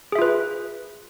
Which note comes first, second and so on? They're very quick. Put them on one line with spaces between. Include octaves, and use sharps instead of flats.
G#4 E5 F4 B4